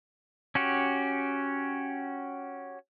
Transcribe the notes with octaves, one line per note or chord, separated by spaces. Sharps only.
C#4 F#4 G4